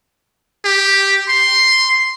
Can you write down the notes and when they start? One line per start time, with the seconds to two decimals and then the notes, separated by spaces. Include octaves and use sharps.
0.65 G4
1.29 C6